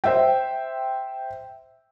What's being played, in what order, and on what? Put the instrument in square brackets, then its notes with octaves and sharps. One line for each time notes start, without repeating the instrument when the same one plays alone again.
[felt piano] C5 E5 G5